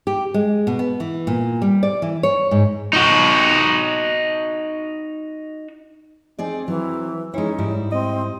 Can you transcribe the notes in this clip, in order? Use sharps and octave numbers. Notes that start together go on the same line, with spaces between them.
G4
G#3
B2
B3
E3
A#2
G3
D5
E3
C#5
G#2
D#4 F#4
C4 D#4 G#4 D5
E3 F#3
G#3 C#4 D#4 E4
G#2 G3 E4
C4 D#5